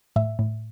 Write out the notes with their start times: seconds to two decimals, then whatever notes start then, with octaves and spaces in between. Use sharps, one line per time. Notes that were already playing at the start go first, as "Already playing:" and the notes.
0.16 A2 E5
0.39 A2